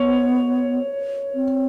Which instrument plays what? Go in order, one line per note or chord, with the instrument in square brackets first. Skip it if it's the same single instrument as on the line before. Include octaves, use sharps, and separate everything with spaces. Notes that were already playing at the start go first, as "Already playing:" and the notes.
Already playing: [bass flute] B3 [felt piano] C#5
[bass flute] C4